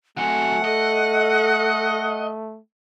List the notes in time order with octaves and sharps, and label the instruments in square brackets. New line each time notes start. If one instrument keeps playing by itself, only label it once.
[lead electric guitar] F#3 C4 [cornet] A3 [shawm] F#5 [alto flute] G#5
[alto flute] A4 [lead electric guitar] D#5